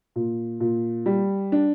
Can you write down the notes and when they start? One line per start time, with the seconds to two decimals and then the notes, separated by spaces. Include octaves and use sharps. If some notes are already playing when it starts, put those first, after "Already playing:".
0.16 A#2
0.60 A#2
1.06 G3
1.52 D4